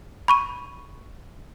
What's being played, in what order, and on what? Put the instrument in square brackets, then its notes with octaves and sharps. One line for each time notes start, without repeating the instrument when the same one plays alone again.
[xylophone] B5 C#6 D#7